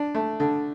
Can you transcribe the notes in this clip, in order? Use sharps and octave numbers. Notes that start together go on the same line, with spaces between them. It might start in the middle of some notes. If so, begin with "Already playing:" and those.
Already playing: D4
A3
D3